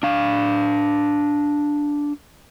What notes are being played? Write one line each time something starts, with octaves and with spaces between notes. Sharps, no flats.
D4 F5